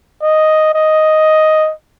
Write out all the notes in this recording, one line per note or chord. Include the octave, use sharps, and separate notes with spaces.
D#5
D#5